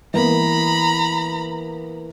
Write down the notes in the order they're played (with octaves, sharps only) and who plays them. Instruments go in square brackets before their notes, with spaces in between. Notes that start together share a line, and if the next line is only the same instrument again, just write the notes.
[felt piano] E3 A#3 B3 [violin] A#5 B5